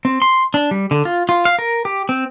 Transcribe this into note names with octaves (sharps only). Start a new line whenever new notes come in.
C4
C6
D4
G3
D3
F4
F4
F5
A#4
G4
C4